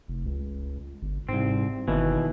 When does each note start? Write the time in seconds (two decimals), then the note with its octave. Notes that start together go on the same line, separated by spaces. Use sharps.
0.08 F1
0.26 C#2
1.02 G1
1.29 C2 G#2 C4
1.88 G1 D#2 B2 E3